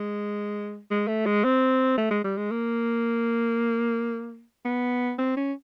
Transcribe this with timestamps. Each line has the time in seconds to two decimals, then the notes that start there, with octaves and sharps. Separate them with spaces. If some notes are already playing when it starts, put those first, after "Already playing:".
Already playing: G#3
0.91 G#3
1.08 A3
1.26 G#3
1.44 C4
1.98 A3
2.11 G#3
2.24 G3
2.37 G#3
2.51 A#3
4.65 B3
5.18 C4
5.37 C#4